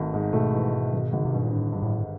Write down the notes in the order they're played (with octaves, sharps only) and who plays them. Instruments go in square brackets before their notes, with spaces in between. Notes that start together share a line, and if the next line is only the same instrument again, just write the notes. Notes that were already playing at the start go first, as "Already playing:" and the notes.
Already playing: [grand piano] G#1 A3
G#2
[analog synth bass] B2 [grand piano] A3
[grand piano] E3
G#2
G#1
[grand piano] G#1 [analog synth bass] C#3
[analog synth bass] C3
[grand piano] G2 [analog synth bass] B2
[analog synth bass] A#2
[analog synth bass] A2 [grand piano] D3
[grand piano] G2
[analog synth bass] A2
[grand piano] G2